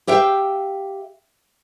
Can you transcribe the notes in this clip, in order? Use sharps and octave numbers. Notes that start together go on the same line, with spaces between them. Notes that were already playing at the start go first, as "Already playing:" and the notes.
G4 E5 F5 G5